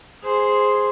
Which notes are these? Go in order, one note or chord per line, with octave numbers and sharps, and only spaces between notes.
G#4 C5